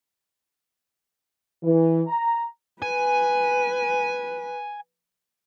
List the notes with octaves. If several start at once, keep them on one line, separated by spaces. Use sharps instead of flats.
E3
A#5
B4 G#5